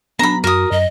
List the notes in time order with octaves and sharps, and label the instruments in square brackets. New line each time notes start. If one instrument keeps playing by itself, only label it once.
[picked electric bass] F#3 B3 [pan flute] D4 [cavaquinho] A#5 B5
[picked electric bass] F#2 [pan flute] F#4 [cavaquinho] A#4 D#6
[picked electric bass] F#2 [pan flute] D#5